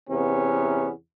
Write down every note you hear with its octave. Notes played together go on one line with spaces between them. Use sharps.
E2 C3 B3 C#4